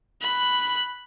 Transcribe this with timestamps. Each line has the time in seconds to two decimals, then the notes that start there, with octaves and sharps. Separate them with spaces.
0.22 B5 F#6